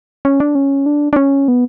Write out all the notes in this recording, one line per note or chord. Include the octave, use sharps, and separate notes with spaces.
C#4
D4
C#4
D4
D4
C#4
B3